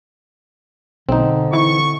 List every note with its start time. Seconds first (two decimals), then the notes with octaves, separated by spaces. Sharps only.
1.09 B1 D3 C4 D#4
1.53 E3 C#6